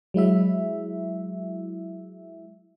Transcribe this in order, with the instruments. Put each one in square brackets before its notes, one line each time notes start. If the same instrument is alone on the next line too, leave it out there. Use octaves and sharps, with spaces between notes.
[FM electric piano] F#3 G#3 E4 E5